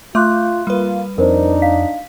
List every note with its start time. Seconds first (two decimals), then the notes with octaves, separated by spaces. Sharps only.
0.15 A3 F4 E5 C6 D6 F#6
0.67 G3 A#3 F4 B4
1.18 F2 D4 D#4 A#4 C5
1.62 F5 B6